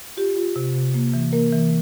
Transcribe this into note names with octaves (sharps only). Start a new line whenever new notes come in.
F4 G4
F4
C3
C3
A#3
E3
A#3 A#4
E3